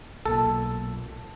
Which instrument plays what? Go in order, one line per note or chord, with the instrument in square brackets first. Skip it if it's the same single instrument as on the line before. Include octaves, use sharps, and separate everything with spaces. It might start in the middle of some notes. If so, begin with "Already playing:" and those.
[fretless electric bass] B1 A#2 [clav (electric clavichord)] A4